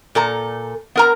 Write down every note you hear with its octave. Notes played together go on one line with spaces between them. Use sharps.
A#2 A4 A#5
B3 A#4 A#5